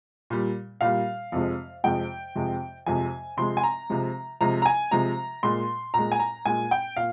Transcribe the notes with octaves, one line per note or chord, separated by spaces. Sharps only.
A#2 G3
A#2 G3 F5
F2 C3 F3 G#3
F2 C3 F3 G#3 G5
F2 C3 F3 G#3
F2 C3 F3 G#3 G#5
C3 F3 G#3 C6
G#5
A#5
C3 F3 G#3
C3 F3 G#3 A#5
A#5
G#5
C3 F3 G#3 A#5
A#2 G#3 C6
A#2 G#3 A#5
G#5
A#5
A#2 G#3 G#5
G5
A#2 F5